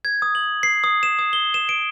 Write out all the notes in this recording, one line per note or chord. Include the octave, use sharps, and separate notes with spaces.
G#6
D#6
F#7
C7
D#6
E7
D#6
G7
E7
D7